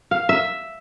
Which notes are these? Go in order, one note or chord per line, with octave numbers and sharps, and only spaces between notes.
F5
E5